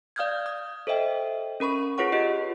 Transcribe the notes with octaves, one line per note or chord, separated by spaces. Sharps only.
D5 F5 D#6 F6 G6 G#6
D#6
A4 C5 D#5 E5 G5
C#4 A#4 B5 C#6
F4 G#4 B4 C#5 F#5 C#6
F4 G4 D#5